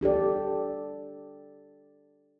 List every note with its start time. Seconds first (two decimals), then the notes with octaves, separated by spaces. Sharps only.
0.01 D4 G4 A4 D5